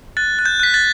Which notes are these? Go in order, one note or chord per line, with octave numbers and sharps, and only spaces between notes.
F#6 A6
F#6
G6
F#6 B6
A6